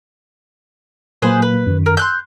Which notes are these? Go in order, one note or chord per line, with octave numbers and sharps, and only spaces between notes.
A#2 F#3 A#3 G#4 B4 C5
B4
F#2 D#3
A#4
C6 E6 F#6 G6